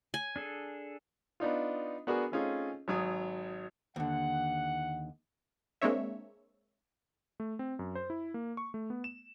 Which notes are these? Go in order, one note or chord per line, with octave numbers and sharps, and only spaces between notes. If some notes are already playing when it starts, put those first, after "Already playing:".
G#5
D4 G#4 A4
B3 D4 D#4 F4
B3 D4 F#4 G#4 A#4
A3 C4 C#4 D#4 F4 G#4
G#1 F#3 D#6
D#2 D3 F#5
G#3 A#3 C4 D4 C#5 E5
A3
C4
F#2
C5
E4
A#3
C#6
A3
B3
E7